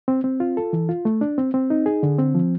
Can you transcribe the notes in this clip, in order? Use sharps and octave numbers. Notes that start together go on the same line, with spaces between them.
C4
C4
F4
A4
E3
F4
A3
D4
C4
C4
D#4
G#4
D3
C4
F3